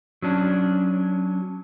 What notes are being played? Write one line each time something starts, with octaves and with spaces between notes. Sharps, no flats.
F#3 C#4 D4